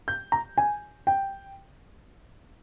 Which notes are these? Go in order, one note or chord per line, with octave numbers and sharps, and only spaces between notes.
G6
A#5
G#5
G5